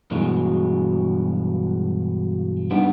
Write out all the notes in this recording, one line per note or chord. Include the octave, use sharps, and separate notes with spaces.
G2 B2 E3 F#3 G#3
G3 B3 D4 D#4